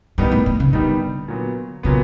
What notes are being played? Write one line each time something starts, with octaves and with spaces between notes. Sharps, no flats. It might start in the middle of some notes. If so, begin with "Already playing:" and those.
G#2 D#3 G3 B3 D#4
A2
A2
C#3
D3 D#3 G3 B3 D#4
A#2 F#3 B3
A#2 C#3 F#3 B3